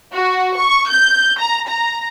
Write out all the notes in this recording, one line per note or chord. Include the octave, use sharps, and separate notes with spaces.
F#4
C#6
G6
A#5
A#5